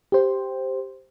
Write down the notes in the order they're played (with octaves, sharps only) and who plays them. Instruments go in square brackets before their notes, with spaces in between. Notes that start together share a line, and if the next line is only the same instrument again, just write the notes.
[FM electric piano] G4 C5